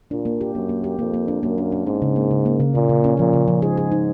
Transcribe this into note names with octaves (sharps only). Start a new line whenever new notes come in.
A#2 D4
A#3
G4
F#2 A#3
A#3
G4
F2 A#3
A#3
D4
F#2 A#3
D4
D4
G#2 C#4
C#3
A#3
C#3
A#3
C#3
A#2 C#3
C#3
C#4
A#2 F3
C#3
F3
G#2 G#4
G#4
D#4